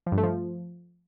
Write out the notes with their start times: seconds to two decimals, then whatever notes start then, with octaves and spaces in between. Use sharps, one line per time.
0.06 F3
0.12 G2
0.18 A3
0.23 F3